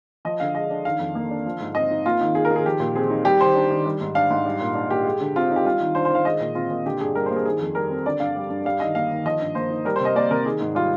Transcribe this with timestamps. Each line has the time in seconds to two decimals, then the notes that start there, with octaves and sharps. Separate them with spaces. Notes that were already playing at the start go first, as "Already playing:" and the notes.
0.25 F3 D#5
0.40 D3 F5
0.55 G#3 D#5
0.70 D4
0.85 D#3 F5
1.00 F2
1.15 A#3
1.31 D4
1.46 F3
1.60 G#2
1.75 C4 D#5
1.91 D#4
2.06 A#3 F4
2.21 D#3
2.35 D#4 G#4
2.45 A#4
2.50 D#3
2.56 G#4
2.65 F3 G4
2.80 A#2
2.95 C4 G#4
3.10 D#4
3.25 G3 G4
3.40 D#3 C5
3.55 D4
3.70 D#3
3.86 G3
4.01 G#2
4.15 D4 F5
4.30 G#2
4.45 G3
4.61 A#2
4.75 D4
4.90 A#2 G4
5.05 G#3
5.21 D3
5.36 C4 F4
5.51 D#4
5.56 G4
5.65 G3 F4
5.80 D#3
5.95 D4 C5
6.05 C5
6.11 D#3 F5
6.25 G#3 D#5
6.40 A#2
6.55 C4 F4
6.71 A#2
6.85 D3 G4
7.00 G2 G#4
7.15 G3 A#4
7.26 C5
7.31 A#3 G#4
7.45 D#3 G#4
7.61 F2
7.75 G3 A#4
7.90 C4
8.06 D3 D5
8.20 G2 F5
8.36 G3
8.50 G2
8.65 G3 F5
8.80 D#3 D#5
8.95 A#3 F5
9.10 D#3
9.25 F3 D#5
9.41 G2
9.55 A#3 C5
9.70 D#4
9.85 G3 A#4
9.96 C5
10.00 C3 D#5
10.15 A#3 D5
10.30 C3 A#4
10.45 D#3 G#4
10.60 G#2
10.75 G3 F4